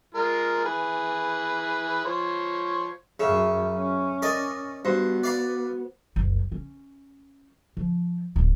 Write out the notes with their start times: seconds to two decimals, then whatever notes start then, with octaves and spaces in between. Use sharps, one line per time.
0.14 G#3 F4 A#4
0.65 E3 G#4 B4
2.05 F3 C#5 C6
3.20 F#2 C#3 F#3 E5 F5
3.77 C#4
4.22 A#4 D5 D#5
4.85 G2 B3 F#4 C5
5.23 D5 F5 B5
6.16 F#1 C2
6.52 C#4
7.77 F3
8.36 D1